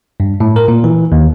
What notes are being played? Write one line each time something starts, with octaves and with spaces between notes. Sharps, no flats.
G2
A2
A#4
A#2
E3
D#2